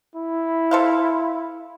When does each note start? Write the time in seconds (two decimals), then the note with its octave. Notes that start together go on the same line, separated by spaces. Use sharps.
0.16 E4
0.71 A4 C5 F5